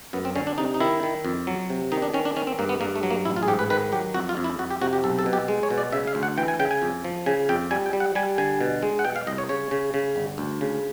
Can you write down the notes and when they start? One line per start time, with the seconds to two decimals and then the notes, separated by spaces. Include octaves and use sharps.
0.13 F#2 B3
0.25 C4
0.35 D3 C#4
0.47 D4
0.58 C3 D#4
0.74 D#4
0.80 D#3 E4
1.03 D#3
1.25 F2
1.47 F#3
1.70 C3
1.92 D#3 D#4
2.02 D4
2.14 D#3 C#4
2.25 D4
2.36 D#3 C#4
2.47 C4
2.59 G2 A#3
2.69 B3
2.81 G2 A#3
2.96 A3
3.03 F#3
3.11 A#3
3.25 A1 E4
3.36 F4
3.43 G#4
3.48 G#2 G4
3.59 B4
3.70 D#3 B4
3.92 F#3 G4
4.14 F2 F#4
4.29 F4
4.37 F2
4.44 E4
4.59 F2 F#4
4.71 G4
4.81 C3 F#4
4.93 G4
5.04 B1 A4
5.19 A4
5.26 B2
5.33 G4
5.48 G#3
5.63 C#5
5.70 B2
5.78 D5
5.92 C#3 E5
6.07 F5
6.15 D2
6.23 F#5
6.38 E3 G5
6.48 G#5
6.59 C#3 G5
6.71 G#5
6.82 F2
7.04 F3
7.26 C#3 G#5
7.49 F2 G5
7.71 G3 G#5
7.86 G5
7.93 G3
8.00 F#5
8.15 G3 G#5
8.38 D3 G#5
8.61 B2
8.83 G#3
8.99 F#5
9.05 B2 G5
9.16 F5
9.27 C2 D#5
9.38 C#5
9.49 C#3 C#5
9.71 C#3
9.94 C#3
10.16 G1
10.38 D2
10.61 C#3